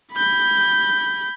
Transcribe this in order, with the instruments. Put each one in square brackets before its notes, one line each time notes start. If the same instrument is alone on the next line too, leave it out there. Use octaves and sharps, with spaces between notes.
[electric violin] B5 G6